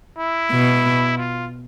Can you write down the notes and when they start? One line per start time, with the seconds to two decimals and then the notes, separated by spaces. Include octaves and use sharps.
0.18 E4
0.52 B2
1.18 F4